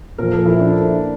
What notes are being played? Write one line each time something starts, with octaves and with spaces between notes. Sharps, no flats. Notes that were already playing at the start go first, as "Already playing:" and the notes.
A#2 F3 A#4
A4
E4
D4